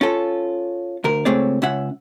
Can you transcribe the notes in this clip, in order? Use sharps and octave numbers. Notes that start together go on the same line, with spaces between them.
C#4 F4 A4
D2 A#4
C#2 A3 C4 G#4 C#5 D5
C#2 C#4 E5 F#5